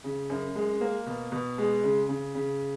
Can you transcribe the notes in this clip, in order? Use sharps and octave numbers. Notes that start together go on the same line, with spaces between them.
C#3
F#2
G#3
A#3
B2
B2
G#3
C#3
C#3
C#3